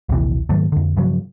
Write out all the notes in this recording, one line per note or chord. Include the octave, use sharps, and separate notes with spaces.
A#1 D#2 C3 E3
G#2 D#3 F#3 A3
F2 D3
G2 C#3 F3 F#3